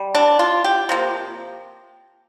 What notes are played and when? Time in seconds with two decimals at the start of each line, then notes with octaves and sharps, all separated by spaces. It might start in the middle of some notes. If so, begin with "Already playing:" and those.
Already playing: G3
0.15 D4
0.39 F4
0.64 G4
0.89 C3 F3 A#3